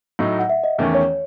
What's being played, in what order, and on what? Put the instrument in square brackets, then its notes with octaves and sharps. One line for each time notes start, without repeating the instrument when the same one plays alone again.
[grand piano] A2 F#3 A3 D#4
[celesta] F#5
E5
D#5
[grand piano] E2 D#3 A3 C#4
[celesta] C#5